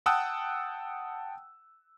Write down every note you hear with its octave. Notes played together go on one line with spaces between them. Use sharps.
F#5 G5 A5 D#6 E6 F#6